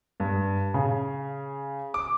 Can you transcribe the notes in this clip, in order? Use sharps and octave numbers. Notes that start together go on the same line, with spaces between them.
G2
C#3
D6